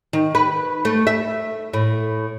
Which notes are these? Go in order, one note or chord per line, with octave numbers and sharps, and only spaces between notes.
D#3
B4
A3
E5
A2